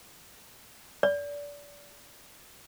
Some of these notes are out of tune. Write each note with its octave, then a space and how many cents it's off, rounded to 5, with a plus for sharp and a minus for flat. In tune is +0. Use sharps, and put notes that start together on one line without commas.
D5 -30